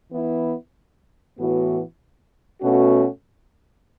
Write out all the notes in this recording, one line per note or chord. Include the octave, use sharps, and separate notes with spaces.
E3 B3 E4
A2 E3 B3 F#4
B2 A3 C#4 F#4